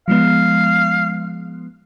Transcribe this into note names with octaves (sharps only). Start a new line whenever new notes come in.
F3 G#3 B3 F5